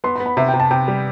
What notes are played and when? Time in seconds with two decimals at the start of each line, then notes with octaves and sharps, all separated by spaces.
0.04 B3 C6
0.16 B5
0.20 B3
0.26 B5
0.37 C3 E5
0.48 G5
0.54 C3
0.60 A5
0.71 C3 G5
0.88 G3